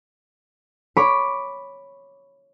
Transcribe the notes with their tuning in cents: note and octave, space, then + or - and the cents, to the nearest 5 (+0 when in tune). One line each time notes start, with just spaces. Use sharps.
C#5 +0 B5 +0 D6 +0